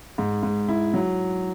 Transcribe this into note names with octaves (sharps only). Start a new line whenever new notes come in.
G#2
G#2
E4
F#3